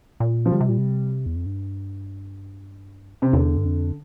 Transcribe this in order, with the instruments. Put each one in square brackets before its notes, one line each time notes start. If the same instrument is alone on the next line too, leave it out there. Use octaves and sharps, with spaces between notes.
[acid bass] A#2
[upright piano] F3
[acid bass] D3 [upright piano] G3
[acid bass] C3
A#2
C3
E2
F2
G2
[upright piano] C3
[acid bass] E2 [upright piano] D3
[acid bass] G2
F2